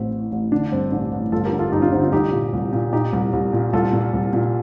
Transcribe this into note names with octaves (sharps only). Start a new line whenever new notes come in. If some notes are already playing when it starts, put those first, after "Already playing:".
Already playing: A1 A2 C4
A2
A1
D3 D4
G2 C4
A1 D4
A1
G1 F4 A4
G4 A#4
D3
F4 A4
G1 D#4 G4
D4 F4
D3 C4 D#4
D4 F4
C2 D#4 G4
A#2
C2
A#2
A#2 D#4 G4
C2
C2
A#2
C2 F4 A4
A#2
C2
A#2